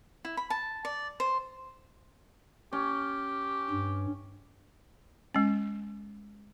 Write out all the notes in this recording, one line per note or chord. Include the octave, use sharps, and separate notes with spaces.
E4
B5
A5
D5
C5
C#4 G4
G2
G#3 C#4